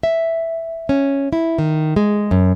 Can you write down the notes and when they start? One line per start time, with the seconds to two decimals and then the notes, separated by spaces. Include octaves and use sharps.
0.03 E5
0.89 C#4
1.33 E4
1.59 D#3
1.96 G#3
2.31 F#2